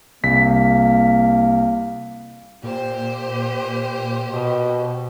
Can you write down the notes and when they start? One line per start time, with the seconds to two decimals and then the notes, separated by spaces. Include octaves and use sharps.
0.23 C2 A#3 B6
2.63 A#2 G4 C5
4.26 B2